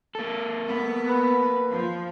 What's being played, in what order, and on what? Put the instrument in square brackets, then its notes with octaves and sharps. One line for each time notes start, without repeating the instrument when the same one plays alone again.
[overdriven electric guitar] A#3 A4
[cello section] B3
[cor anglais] B4
[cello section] F3